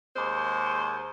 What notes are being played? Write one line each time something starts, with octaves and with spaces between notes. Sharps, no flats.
D#2 G#3 C5